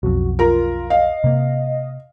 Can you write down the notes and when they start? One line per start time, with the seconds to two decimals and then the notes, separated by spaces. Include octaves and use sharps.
0.03 B1 F2 F#4
0.39 F4 A#4 A#5
0.90 D#5 F5
1.24 C3 A#3